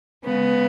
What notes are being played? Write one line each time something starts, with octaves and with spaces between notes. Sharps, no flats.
C#3 G#3 B3